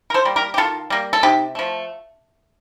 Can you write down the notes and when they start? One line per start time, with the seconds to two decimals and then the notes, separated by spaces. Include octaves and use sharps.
0.10 A#4
0.14 A4 C5
0.25 G3 A#3
0.36 G4 A#4
0.54 G4
0.57 D#3 F4 A4
0.90 G3 A#3
1.13 A4
1.23 C3 D#4 G4
1.55 F3 A3